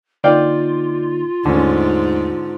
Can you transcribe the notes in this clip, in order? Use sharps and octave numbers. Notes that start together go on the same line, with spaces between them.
D3 A#3 D#4 F4 D5 F5 G5
D#2 G#2 D3 A3 C#4